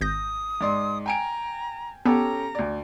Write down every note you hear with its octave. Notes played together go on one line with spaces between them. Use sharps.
G#1 D#6 G6 A#6
G#2 D5 C6
G5 G#5 A#5 D7
B3 C#4 G4 A4 A#5
D2 D5